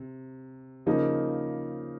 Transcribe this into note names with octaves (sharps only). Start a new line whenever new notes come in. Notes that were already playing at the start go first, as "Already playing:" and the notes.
Already playing: C3
C#3 F3 A#3 D#4